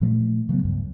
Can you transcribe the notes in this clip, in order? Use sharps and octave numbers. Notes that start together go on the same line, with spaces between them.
A#2 F3 A3
C#3 F#3 G3 B3
C#2 G2